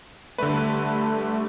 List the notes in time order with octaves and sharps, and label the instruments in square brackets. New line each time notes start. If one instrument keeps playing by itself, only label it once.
[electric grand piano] D3 B4 [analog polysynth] G3 A3